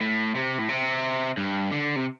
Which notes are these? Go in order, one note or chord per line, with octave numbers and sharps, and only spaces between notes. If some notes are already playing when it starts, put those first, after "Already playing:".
A2
C3
A2
C3
G2
D3
C3